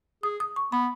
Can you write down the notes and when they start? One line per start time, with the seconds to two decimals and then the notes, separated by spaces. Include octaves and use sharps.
0.23 G#4 D#6
0.40 D#6
0.56 C#6
0.72 B3 B5